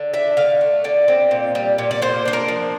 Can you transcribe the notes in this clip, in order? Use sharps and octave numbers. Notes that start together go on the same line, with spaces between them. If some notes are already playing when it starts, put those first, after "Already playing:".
Already playing: D3
D4 E5
D3 F5
A3
D3 D5
C4
A#2
G3
A#2
D5
A#3 C5
D4 C5
A#4
F3